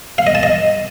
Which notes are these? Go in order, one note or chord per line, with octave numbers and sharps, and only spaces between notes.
F5
D#5
A5
D#5